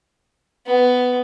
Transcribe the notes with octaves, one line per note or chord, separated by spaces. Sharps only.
B3